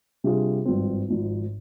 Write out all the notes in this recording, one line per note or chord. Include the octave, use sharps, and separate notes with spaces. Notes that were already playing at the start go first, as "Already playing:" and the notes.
C3 G3 D4 F4 G#4
G#1 G2 F3 C4
G#1 G#2 F3